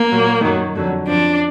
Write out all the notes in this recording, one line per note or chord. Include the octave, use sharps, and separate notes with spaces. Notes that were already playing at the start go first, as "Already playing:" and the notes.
Already playing: A#3
A#2 F#3
F#2 D#3 F#3
F2 D3 F#3
F2 F3 D4